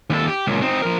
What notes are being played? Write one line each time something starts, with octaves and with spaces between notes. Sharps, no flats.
D#2 A4
G4
C#2 A#2
C4 D#4
F3 A#4